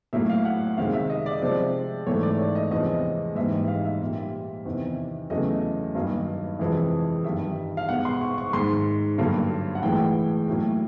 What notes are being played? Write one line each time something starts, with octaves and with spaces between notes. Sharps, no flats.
A2 F#3 A#3 E5
F5
F#5
C3 D#3 G#3 F5
E5
D#5
D5
C3 F3 G#3
G#2 E3 A3 C#5
D5
C#5
D#5
E2 C3 F3 G#3 D#5
G#2 E3 G3 A#3 E5
D#5
F5
E5
A#2 G3 A#3
E2 C3 D#3
E2 C#3 F#3 A3 D#5
G2 D#3 F#3 A#3
F2 C3 E3 G#3
G2 D#3 G3 E5
F5
B2 G#3 F#5
C6
C#6
C#6
G#2 D#3 G#3 C6
G2 D3 F#3 A#3
F#5
A2 E3 G#3 G5
A2 F#3 A#3